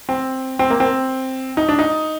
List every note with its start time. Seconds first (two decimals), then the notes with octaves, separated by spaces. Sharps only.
0.09 C4
0.59 C4
0.70 A#3
0.80 C4
1.57 D#4
1.69 D4
1.79 D#4